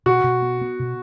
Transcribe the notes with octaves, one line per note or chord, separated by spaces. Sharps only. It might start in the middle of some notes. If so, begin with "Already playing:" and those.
B2 F#4
B2
B3
B3
B2